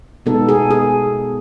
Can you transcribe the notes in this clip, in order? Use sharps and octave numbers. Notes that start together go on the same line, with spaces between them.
B2 G#3 B3 D#4 A4
G#4
G#4